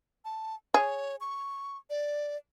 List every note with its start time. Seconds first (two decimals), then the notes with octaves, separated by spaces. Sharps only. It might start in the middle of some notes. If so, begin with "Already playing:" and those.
0.25 A5
0.74 G#4 C#5
1.21 C#6
1.90 D5